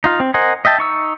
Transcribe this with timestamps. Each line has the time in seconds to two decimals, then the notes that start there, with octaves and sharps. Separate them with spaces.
0.04 D#4 F4 F5
0.20 C4
0.34 A#4 C5 D#5 F#5 G#5
0.65 D#5 E5 G5 A5
0.78 D#4 C#6 E6